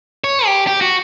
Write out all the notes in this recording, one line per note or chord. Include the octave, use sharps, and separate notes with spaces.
C#5
G4
G4
F#4